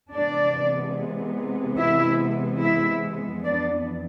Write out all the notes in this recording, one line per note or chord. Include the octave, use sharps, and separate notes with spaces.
C3 E3 G#3 B3 D4 D5
E4 E5
E4 E5
F2 E3 B3 D4 D5